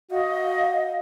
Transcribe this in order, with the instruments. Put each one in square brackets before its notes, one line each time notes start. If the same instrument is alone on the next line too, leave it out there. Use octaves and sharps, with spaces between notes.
[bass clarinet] F#4 [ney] D#5 [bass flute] F5